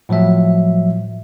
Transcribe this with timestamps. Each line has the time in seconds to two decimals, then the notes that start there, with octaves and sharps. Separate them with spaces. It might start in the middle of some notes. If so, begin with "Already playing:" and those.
0.09 A2 F3 F#3 E5